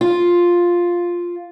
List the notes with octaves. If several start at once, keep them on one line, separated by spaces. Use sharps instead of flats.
F4